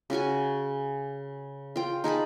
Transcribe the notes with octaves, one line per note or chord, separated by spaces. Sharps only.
C#3 C#4 F#4 G#5
F4 G5
D#4 G#4 A5 B5